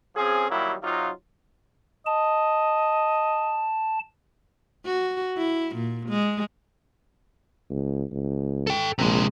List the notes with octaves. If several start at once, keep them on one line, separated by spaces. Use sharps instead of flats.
F3 C4 C#4 G#4
D#3 F#3 G3 A#3 E4
C3 F#3 D#4 F4
D#5 A5
F#4
E4
A#2
G#3
C#2
C#2
A4 G5
A#1 C3 G#3